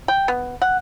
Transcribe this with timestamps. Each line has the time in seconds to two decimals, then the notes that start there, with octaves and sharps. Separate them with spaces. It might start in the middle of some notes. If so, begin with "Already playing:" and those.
0.08 G5
0.28 B3
0.62 F#5